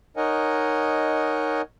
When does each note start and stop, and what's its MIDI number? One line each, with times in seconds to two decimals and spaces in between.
0.17 1.62 63
0.17 1.62 70
0.17 1.62 73
0.17 1.62 75
0.17 1.62 78
0.17 1.62 80